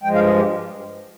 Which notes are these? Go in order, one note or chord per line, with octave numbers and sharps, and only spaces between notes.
G2 F3 G#3 G5
F5
G#4
G4